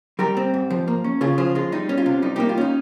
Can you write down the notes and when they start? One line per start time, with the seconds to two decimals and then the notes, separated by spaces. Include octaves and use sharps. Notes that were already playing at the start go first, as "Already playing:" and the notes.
0.19 G3 G4 A#4
0.37 C4
0.54 G#2
0.70 F3
0.88 A#3
1.04 C#4
1.21 C#3 F4 G#4
1.38 F3 F4 G#4
1.55 G#3 F4
1.72 G3 D#4
1.89 C#4
1.98 F4
2.06 C3
2.22 G3 D#4
2.36 A#3 D#4 G4
2.49 F4
2.57 C#4 D#4